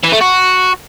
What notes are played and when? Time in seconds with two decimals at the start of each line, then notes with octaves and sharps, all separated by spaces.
0.03 E3
0.12 A3
0.21 F#4